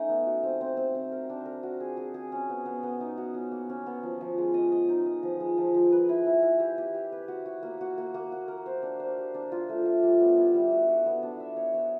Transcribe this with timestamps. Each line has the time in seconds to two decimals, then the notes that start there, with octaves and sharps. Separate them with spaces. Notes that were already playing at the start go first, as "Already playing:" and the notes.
Already playing: A3 C#4 D#4
0.09 B3
0.26 F#4
0.43 C4
0.61 C4
0.77 C4
0.95 C4
1.12 A#4
1.30 D4
1.45 A#4
1.63 F#4
1.80 G#4
1.97 G#4
2.14 G#4
2.32 C#4
2.50 B3
2.66 B3
2.83 B3
3.00 D#4
3.17 F#4
3.34 C#4
3.51 A#3
3.69 C#4
3.86 B3
4.03 F3
4.21 F3
4.38 G#3
4.54 D#5
4.72 D#5
4.89 D#4
5.06 D#5
5.23 F3
5.40 G#3
5.58 F3
5.74 F3
5.92 B4
6.09 E4
6.26 E4
6.42 E4
6.60 G4
6.78 G4
6.94 G4
7.12 B4
7.28 F#4
7.46 F#4
7.63 A#3
7.81 F#4
7.98 A#3
8.14 A#3
8.32 F#4
8.48 A#4
8.66 C5
8.83 D4
9.00 C5
9.18 G4
9.34 D4
9.52 F4
9.69 A3
9.85 F4
10.03 G3
10.20 B3
10.38 E4
10.54 G3
10.71 F#4
10.89 F#4
11.06 B3
11.23 D4
11.40 E5
11.57 C#5
11.74 C#5